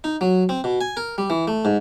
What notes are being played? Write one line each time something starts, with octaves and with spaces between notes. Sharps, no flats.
D#4
F#3
C4
B2
G#5
A#4
G3
E3
A3
G#2